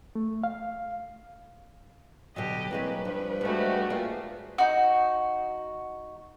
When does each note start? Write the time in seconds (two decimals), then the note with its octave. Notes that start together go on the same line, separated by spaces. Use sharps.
0.15 A3
0.44 F5
2.36 B2 D3 F#3 G4 D#5
2.71 C2 F#3 G#3 A#3 B4
3.05 G2 F3
3.41 F3 G#3 A3 F#4 G4
3.90 A#2 F4 G#4 D#5
4.58 D#4 F#4